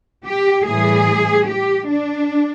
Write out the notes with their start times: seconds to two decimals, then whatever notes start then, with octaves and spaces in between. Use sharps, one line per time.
0.26 G4
0.68 A2 E3 G3 G#4
1.50 G4
1.91 D4